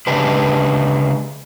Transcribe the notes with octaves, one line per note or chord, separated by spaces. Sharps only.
C#3 G#3 D4 G4 B4